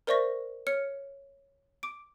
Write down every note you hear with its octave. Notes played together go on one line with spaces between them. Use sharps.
A#4 C5 D5 E5 C#6 A#6
C#5 F6 C#7
D6 D7